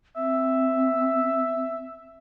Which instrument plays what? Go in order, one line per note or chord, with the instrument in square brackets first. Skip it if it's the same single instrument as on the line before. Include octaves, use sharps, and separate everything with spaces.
[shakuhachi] C4 [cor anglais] E5